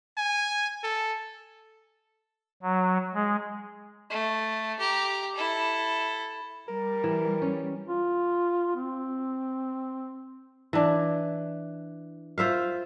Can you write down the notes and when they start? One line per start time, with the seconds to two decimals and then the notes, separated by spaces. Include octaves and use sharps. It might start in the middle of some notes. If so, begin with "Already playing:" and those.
0.17 G#5
0.84 A4
2.62 F#3
3.14 G#3
4.10 A3
4.80 G4 A#5
5.35 E4 A4
6.68 G3 A#4
7.04 E3
7.42 C#4
7.89 F4
8.76 C4
10.73 E3 D4
12.38 F4 C5 E5 F5